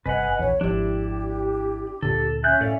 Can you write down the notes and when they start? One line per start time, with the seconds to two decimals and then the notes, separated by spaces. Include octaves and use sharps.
0.06 G1 C3 B4 D#5 F#5 G#5
0.39 A#1 E2 C#5
0.61 G#1 F3 D4 E4 G4
2.02 D2 A#2 D3 A4
2.44 C#4 E5 G#5 F#6 G6
2.61 A2 A4 D5 F5